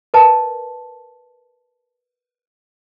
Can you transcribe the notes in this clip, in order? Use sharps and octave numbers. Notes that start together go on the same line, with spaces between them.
A#4 B4 D#5 A5